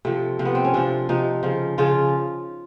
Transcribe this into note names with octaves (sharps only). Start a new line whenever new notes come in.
C3 F3 A3
C3 F3
B3
C4
C#4
C3 F3 D4
C3 F3 D#4
C#3 F3
C#3 F3 F4